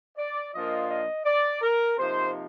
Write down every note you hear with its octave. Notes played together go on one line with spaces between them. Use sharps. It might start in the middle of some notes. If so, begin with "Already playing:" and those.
D5
A#2 F3 A#3 D4 F4 D#5
D#5
D5
A#4
C3 F3 A#3 D#4 C5